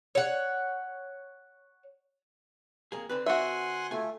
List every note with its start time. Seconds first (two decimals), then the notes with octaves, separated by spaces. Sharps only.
0.15 C#5 F#5
2.92 F2 A#3 G#4
3.09 D3 C4 B4
3.26 F#4 E5 F#5 G#5 C6
3.91 A3 F4 G#5